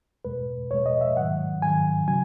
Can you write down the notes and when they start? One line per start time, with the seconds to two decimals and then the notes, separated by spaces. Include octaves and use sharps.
0.25 E2 B2 G#3 B4
0.71 E2 B2 G#3 C#5
0.86 D#5
1.01 E5
1.16 G#2 D#3 F#3 F#5
1.62 G#2 D#3 F#3 G#5
2.08 C#3 F#3 G#5